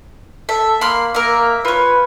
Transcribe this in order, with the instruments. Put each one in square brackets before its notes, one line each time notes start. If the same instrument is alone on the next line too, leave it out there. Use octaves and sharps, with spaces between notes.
[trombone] A4 [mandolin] E5
[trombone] A#3 [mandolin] B5 C6 F6
[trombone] A#3 [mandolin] A#4 E5
[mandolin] F4 C#5 [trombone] B4